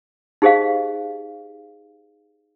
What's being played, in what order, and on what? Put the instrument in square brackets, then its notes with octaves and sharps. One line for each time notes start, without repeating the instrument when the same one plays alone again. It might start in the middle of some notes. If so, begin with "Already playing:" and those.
[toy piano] D#4 G4 G#4 C5 D#5 F5